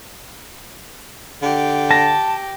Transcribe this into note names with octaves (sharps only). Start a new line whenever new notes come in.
D3 G4
A5 A#6